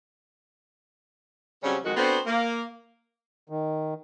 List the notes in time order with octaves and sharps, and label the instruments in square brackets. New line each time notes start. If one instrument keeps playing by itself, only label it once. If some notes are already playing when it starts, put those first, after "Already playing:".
[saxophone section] C#3 F#3 G3 C4 C#4
F2 G#2 D#3 G#3 F#4
B3 C4 D4 F#4 A4 C5
A#3
[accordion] D#3